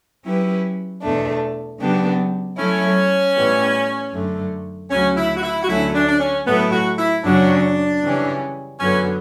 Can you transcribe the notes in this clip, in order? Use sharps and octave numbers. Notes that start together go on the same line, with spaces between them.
F#3 C#4 E4 G4 B4
E2 B2 A3 D4
C#3 F#3 B3 D4 G4
F#3 A3 C#4 E4
A2 E3 G3 B3
F#2 D3 A3
D2 C#3 F#3 C#4
E4
F#4
E4
F#4
D2 D3 F#3 A3 C#4 E4
D4
D4
C#4
A2 F#3 A3 B3 E4
F#4
E4
F#2 C#3 F#3 C#4 D4 F#4
C#3 E3 G3 C#4
F#2 D3 F#3 B3 C#4